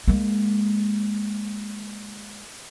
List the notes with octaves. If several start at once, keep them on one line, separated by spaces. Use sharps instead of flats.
G#3 A#3